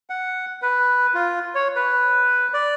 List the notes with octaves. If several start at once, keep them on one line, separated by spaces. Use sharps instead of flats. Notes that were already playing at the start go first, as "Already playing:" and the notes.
F#5
B4
F4
C#5
B4
D5